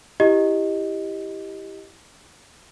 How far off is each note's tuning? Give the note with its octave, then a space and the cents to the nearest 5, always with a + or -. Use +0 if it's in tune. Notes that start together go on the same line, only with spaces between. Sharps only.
E4 +0 G4 +0 D#5 +0